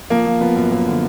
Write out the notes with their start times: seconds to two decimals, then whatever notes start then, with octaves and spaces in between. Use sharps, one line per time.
0.10 F3 A#3
0.26 F3
0.41 F3 B3
0.56 F#2
0.71 F#2 A#3
0.87 D3